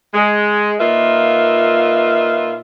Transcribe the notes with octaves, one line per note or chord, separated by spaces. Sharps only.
G#3
A#2 A#3 D#4 F4 B4 E5